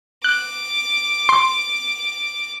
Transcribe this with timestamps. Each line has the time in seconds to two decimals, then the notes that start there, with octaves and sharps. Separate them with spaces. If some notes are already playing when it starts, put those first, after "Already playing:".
0.24 D6 F#6
1.29 C6